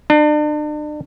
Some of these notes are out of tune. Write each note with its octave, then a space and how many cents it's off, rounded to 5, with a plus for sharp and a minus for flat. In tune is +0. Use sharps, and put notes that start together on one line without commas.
D4 +40